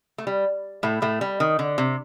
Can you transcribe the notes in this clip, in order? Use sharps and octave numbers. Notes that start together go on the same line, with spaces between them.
A3
G3
A2 A3
A2 A3
G3
D#3
D3
C3